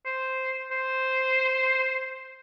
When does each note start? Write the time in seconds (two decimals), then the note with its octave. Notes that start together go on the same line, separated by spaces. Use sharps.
0.06 C5
0.71 C5